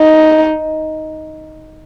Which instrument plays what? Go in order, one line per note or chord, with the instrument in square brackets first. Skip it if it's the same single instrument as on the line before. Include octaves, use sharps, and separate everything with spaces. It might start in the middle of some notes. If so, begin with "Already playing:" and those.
Already playing: [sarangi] D#4